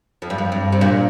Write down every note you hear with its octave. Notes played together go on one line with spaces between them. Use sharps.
F2
G2
F2
G2
C3
A#2